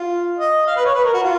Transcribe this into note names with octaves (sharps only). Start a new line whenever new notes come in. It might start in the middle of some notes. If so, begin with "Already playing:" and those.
Already playing: F4
D#5
F5
B4
C#5
B4
A#4
F#4
F4